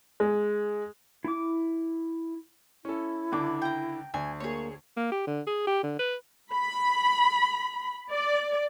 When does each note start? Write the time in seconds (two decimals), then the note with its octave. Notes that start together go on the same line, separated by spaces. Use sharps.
0.20 G#3
1.24 E4 D6
2.85 C#4 E4 A4
3.32 C#2 D3 F#5 D6
3.62 G5 A#5
4.14 D2 G#5
4.40 A#3 G#4 C#5
4.97 A#3
5.12 G4
5.27 D3
5.47 G#4
5.67 G4
5.83 D3
5.99 B4
6.53 B5
8.10 D5